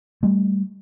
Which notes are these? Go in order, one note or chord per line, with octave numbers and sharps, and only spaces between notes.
G3 A3